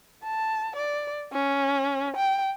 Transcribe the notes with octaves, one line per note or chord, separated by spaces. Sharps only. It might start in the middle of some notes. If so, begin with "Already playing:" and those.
A5
D5
C#4
G5